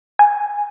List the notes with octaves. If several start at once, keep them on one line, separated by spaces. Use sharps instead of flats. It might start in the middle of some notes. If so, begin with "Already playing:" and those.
G#5